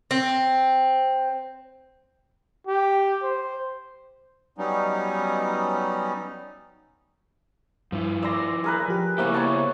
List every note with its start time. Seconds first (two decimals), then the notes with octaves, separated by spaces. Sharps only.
0.11 C4
2.67 G4
3.23 C5
4.58 F#3 G3 B3 C#4 D#4
7.92 G2 F3 E4
8.23 D5 C6 E6 A#6
8.64 G#4 A#4 B4
8.88 F3 G4
9.18 C#3 A#3 B3 E4 F#4 G4 C5 E5
9.34 C#5 A5